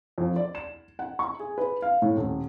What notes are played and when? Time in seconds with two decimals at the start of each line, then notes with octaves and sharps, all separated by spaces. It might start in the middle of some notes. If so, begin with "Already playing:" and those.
0.18 F2
0.36 D5
0.55 E7
0.99 F#5
1.19 C#6
1.40 G#4
1.58 B4
1.82 F5
2.02 A2
2.17 D#1